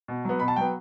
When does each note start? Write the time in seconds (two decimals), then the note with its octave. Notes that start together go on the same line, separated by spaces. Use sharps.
0.08 B2
0.25 F#3 B3
0.40 B2 B5
0.48 A5
0.56 F#3 B3 G5